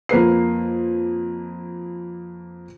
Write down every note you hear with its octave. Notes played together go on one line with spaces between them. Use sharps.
F2 A#3 B4 C7